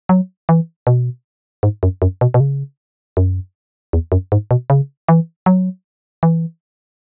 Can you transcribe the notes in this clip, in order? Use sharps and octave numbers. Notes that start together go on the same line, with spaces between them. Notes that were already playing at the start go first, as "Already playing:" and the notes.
F#3
E3
B2
G#2
F#2
F#2
B2
B2
C#3
F#2
E2
F#2
G#2
B2
C#3
E3
F#3
E3